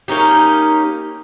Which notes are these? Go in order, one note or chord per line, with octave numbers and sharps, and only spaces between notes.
A#3 C#4 D#4 G4